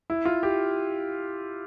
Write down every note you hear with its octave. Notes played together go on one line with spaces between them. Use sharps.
E4
F4
G4